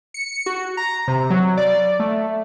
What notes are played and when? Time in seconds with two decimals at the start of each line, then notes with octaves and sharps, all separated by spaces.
0.14 C#7
0.46 F#4
0.77 A#5
1.08 C3
1.30 F#3
1.57 D5
2.00 A3